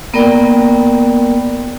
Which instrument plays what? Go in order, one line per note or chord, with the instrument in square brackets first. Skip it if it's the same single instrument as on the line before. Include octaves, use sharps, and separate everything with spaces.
[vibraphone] A#3 B3 A#4 D5 G5